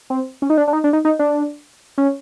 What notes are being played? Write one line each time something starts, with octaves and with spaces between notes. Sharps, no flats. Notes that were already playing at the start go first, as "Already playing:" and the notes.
C4
C#4
D#4
D4
D4
D#4
D4
D#4
D#4
D4
C#4